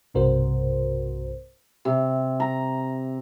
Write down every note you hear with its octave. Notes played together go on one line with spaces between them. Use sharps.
B1 G2 C3 F#4 A#4 C5
C3
A#5